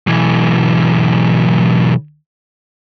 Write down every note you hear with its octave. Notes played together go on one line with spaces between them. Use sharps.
B1 E3